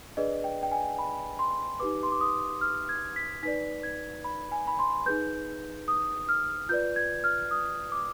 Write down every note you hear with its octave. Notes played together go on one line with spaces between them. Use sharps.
D4 G#4 B4 D5 D#5
G5
G5
G#5
B5
C6
D#4 G4 B4 D6
C6
D6
D#6
F6
G#6
B6
D#4 B4 D5 B6
G#6
B5
G#5
B5
C6
D#4 G#4 B4 G6
D#6
F6
F4 B4 D5 G6
G#6
F6
D#6
D6